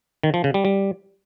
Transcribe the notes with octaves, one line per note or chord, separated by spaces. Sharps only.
D#3
F3
C#3
G3
G3